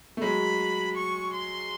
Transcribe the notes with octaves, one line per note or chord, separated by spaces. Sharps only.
A3
F#3 G#3 B5
C#6
C6